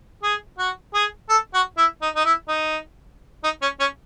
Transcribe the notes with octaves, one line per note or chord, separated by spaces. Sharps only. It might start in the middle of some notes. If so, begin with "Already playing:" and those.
G#4
F#4
G#4
A4
F#4
E4
D#4
D#4
E4
D#4
D#4
C#4
C#4